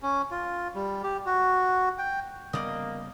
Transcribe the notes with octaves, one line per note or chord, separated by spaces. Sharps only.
C#4
F4
G3
G4
F#4
G5
C#3 G3 A#3 B3 D5 D#5